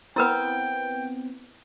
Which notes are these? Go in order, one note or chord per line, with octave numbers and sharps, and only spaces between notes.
B3 C4 E4 A#4 B4 G5